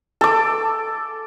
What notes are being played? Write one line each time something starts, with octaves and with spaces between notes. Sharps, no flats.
A4 D6